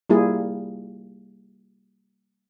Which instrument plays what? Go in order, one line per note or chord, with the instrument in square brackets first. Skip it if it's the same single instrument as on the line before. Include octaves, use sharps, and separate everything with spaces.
[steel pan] G3 A#3 E4 F4 G#4